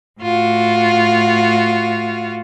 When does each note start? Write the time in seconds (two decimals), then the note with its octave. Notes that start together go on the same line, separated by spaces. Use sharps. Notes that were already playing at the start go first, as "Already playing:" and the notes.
0.21 A2 F4 F#4